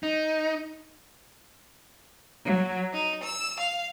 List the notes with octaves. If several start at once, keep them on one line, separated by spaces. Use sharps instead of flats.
D#4
F#3
D#4
E6
F5